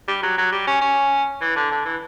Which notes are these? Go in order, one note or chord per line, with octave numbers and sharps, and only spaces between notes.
G3
F#3
F#3
G3
C#4
C#4
E3
D3
D3
E3